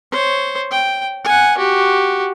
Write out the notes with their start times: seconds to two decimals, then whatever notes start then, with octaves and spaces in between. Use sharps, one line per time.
0.12 C5 C#5
0.71 G5
1.25 F#5 G#5
1.58 F#4 G4